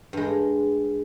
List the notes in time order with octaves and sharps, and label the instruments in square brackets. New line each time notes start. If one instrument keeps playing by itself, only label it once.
[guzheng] G2 G#3